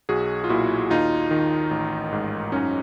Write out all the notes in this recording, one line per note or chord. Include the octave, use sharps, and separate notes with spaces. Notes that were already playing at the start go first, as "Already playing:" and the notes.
B1 F#4 G#4
F4
A#2 E4 F#4
D#2 D#4 F4
D#3
A1
G#2
F#2 C#4 D#4